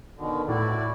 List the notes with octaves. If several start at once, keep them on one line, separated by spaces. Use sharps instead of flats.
B2 D3 D#3
A2 E4 F#4 D5